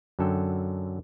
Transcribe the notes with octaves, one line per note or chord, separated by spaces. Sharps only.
F#2 D3 F#3 A4 G5